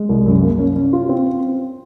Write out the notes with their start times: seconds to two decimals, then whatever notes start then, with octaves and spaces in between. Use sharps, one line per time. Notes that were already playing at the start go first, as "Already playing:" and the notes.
Already playing: G#3
0.09 C2
0.26 F#2
0.43 A#3
0.59 C#4
0.76 C#4
0.93 F4
1.09 C4